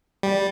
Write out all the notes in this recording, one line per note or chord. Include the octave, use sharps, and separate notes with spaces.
G3